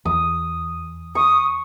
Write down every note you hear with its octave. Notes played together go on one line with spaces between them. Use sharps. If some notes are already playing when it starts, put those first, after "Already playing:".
E2 D#6
C#6 D#6